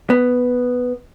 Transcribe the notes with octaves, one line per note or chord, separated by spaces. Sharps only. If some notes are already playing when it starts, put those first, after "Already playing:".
B3